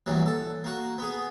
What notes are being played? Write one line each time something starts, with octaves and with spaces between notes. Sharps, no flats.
A#1 G2 E3 F#3
A4
A#3 F#4
B3 G#4